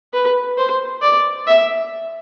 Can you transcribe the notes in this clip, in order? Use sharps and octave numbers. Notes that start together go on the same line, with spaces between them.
B4
C5
D5
E5